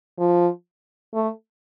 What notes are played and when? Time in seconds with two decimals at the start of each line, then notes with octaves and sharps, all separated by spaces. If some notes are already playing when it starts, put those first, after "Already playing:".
0.19 F3
1.14 A3